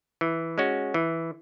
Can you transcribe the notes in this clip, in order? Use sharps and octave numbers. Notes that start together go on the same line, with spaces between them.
E3
G#3 C#4 F#4
E3